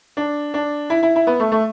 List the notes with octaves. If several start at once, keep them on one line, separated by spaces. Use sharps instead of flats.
D4
D4
E4
E4
E4
B3
A3
A3